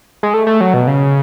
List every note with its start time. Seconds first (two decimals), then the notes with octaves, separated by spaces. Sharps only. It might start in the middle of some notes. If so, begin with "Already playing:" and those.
0.23 G#3
0.34 A3
0.47 A3
0.61 F#3
0.74 B2
0.87 C#3